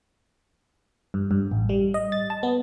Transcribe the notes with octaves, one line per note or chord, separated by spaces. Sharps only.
G2
G2
A1
G3
D#5
A6
A5
B3